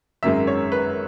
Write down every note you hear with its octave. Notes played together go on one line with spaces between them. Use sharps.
G#1 F#2 D#3 G#3 E5
C#5
B4